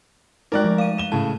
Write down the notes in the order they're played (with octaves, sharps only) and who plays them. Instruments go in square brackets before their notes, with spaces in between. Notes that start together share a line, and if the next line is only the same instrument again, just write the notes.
[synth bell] G#3 A3 D#4 [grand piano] A#4 D5 F#6
[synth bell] F3
F5 D#7
[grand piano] E7 G7
[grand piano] A2 C#3 [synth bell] A5